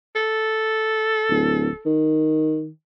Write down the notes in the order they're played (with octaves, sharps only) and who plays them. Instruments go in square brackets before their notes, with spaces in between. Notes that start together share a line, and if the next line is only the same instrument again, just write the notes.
[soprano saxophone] A4
[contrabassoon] D1
D#3